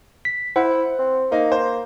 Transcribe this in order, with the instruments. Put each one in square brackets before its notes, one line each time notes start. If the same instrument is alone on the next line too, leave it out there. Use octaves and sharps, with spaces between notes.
[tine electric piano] B6
[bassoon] E4 [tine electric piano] C5 [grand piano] F#5
[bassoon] C4
[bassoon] A#3 [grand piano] D#4
[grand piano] C5